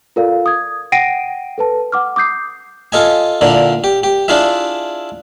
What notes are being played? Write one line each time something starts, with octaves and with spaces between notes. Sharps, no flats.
F4 A4 A#4 D5 F5
D#6 G#6
F#5 G5 A#6 C7 D7 D#7
A4 B4 A5
F#5 D6 F6
D6 D#6 G6 C7
F4 A4 D#5 G#5
A#2 D3 E4
G4
G4
D4 E4 F4 G#4 E5